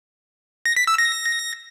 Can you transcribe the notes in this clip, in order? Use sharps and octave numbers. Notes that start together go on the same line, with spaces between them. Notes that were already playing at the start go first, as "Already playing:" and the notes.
A#6
B6
E6
A#6